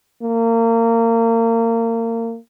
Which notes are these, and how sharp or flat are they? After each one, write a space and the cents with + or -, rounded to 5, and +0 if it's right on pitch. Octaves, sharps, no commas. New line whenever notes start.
A#3 -30